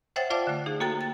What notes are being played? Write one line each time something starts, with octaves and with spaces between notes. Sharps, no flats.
C5 C#5 E5 F#5 G5 A6
F4 C5 D5 F5 A5 D6
D3 A3
D#4 G#4
A#3 F#4 A4 G5 A#5 A6
A6